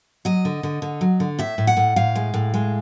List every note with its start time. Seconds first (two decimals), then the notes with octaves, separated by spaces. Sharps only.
0.25 F#3 D#5
0.45 D3
0.63 D3
0.82 D3
1.01 F#3
1.20 D3
1.39 A2 E5
1.58 A2
1.67 F#5
1.77 A2
1.96 A2 F5
2.15 G#3
2.34 A2
2.54 G#3